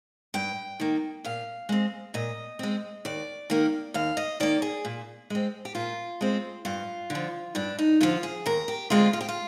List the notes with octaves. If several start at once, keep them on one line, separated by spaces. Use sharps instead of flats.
G2 G5
D#3 A#3
A#2 F5
G#3 C4
A#2 D#5
G#3 C4
D#2 D5
D#3 A#3
D#2 F5
D#5
D#3 A#3 D5
G#4
A#2
G#3 C4
G4
A#2 F4
G#3 C4
G2 F4
D3
F3
G2 D4
D#4
D3 F3 F4
G#4
D#2 A#4
G4
D3 G#3 C4 F4
F4
G4
F4